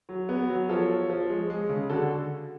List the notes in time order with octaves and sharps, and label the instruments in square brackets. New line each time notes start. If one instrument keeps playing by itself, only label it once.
[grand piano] F#3
B3
F#3
F3 A4 C#5
F3
F3
G#3
G#3
C#3
D3 F#4 A4